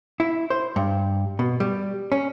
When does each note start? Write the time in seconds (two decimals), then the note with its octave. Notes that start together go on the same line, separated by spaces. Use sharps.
0.20 E4
0.50 C5
0.76 G2
1.39 B2
1.60 G3
2.12 C#4